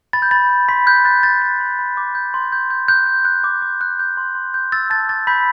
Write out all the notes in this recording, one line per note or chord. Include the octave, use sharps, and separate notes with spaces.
B5 A6
G6
B5 A6
B5
B5 C6 B6
F#6 G6
F#6 A6
B5 A6
G6
B5
B5
D6
G6
C6
G6
G6
F#6 G6
F#6
F#6
D6
D6
F#6
G6
C6
C6
G6
E6 A6
A5 A6
D6 A6
B5 G6 B6